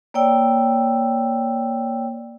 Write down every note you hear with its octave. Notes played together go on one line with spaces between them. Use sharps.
A#3 C#5 D5 G5 E6